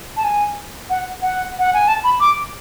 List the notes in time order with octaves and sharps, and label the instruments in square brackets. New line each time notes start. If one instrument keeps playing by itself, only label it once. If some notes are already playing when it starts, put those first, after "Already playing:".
[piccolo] A5
G#5
F#5
F#5
F#5
G#5
A5
B5
D6